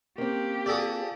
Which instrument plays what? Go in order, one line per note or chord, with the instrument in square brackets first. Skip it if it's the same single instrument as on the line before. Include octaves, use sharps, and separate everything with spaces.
[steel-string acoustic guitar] A#3 C4 [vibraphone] C#4 [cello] G4
[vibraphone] F4 F5 [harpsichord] G#4 A4 D5